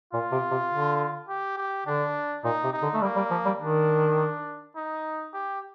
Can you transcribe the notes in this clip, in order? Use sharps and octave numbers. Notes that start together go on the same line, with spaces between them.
A#2 F4
C3
C3
D3
G4
G4
D3 D4
A#2 D#4
C3
D#4
D3
A3
G3 A#3
G3
F3
G3
D#3 D4
D#4
G4